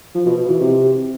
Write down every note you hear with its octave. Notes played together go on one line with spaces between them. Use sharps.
F3
B2
B2
E3
C3